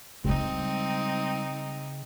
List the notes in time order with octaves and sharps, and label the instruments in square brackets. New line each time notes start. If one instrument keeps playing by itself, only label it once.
[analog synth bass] C#3 [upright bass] G3 G#3 [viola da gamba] C4 D#4